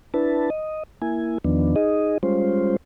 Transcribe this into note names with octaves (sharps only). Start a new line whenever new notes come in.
D4 E4 B4 A5
D#5
A#3 E4 G#5
E2 D#3 F3 B3 D4
D#4 G#4 D#5
G3 G#3 C#4 F4 C5